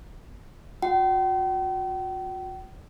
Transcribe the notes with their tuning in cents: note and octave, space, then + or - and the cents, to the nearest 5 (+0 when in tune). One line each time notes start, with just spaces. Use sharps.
F#4 -45 G5 -45